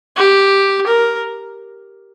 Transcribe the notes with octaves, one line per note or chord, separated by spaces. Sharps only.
G4
A#4